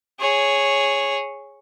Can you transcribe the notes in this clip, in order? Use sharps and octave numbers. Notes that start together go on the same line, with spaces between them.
G#4 C#5